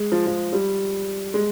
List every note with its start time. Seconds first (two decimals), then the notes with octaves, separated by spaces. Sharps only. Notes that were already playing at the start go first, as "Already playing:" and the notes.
Already playing: G#3
0.12 F3
0.26 F3
0.53 G3
1.34 G#3